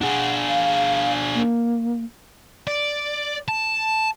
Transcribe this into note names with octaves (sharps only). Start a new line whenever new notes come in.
D4 G#4 F#5
F5
A#3
D5
A5